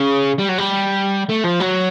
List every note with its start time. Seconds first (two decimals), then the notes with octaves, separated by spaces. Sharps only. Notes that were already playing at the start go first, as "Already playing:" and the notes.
Already playing: C#3
0.38 G3
0.48 F#3
0.58 G3
1.30 A3
1.45 F3
1.60 F#3